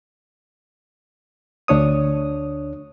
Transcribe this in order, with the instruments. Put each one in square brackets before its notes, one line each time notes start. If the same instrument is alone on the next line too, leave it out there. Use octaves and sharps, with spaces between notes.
[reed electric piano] D2 D4 C#5 D#6